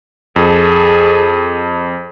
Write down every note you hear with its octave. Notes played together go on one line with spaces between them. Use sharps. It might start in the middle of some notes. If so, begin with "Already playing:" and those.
F2 G#4 A4